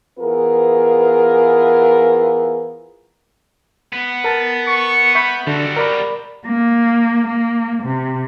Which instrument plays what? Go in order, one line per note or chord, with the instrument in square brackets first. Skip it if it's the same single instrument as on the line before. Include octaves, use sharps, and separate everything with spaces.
[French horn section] E3 B3 F4 G#4 A#4
[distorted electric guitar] B3
[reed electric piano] A#4 A5 A6
[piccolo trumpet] C#6
[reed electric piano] E5 C#6 G6 [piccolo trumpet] B5
[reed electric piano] D3 [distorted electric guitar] G3 A4 [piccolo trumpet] F#4
[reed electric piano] A#4 D5 B5
[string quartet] A#3
A#3
C3